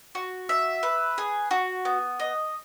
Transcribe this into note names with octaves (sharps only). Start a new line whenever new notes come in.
F#4
E5
B4
G#4
F#4
B3
D#5